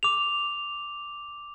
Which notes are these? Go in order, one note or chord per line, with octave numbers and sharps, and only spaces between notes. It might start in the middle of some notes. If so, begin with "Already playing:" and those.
D6 F7